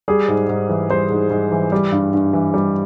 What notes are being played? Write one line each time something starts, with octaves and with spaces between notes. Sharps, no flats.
G3 G#4
G#2
G#2
E3
G3 C5
G#2
G#2
E3
G3
G2
G2
E3
G3